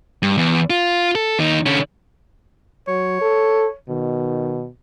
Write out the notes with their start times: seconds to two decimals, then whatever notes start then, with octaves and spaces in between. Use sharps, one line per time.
0.23 G2
0.37 E2
0.70 F4
1.15 A4
1.39 D#2 D#4
1.66 D3 C#4
2.88 F#3 C#5
3.21 A4
3.89 B2 D#3